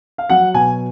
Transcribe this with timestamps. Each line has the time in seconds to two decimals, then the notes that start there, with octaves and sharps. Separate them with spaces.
0.18 F5
0.30 F#3 F#5
0.54 B2 G#5